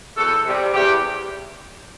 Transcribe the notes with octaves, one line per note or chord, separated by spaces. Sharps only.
E2 F#4 A4
C3 G3
E2 G4